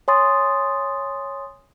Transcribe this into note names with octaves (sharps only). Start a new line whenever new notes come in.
C#5 G#5 C6 D#6 A6